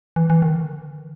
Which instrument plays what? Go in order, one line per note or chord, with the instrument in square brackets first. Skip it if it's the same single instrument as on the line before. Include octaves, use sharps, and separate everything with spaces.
[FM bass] E3
E3
D#3
D3